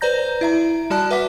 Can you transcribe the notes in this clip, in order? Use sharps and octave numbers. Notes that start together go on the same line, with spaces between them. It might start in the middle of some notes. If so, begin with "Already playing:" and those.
B4 C5 D5 A#5 G6 A#6
E4 E5 A#5
G3 F#4 D5 A5 F#6
B4 E5 F#5 D6 B6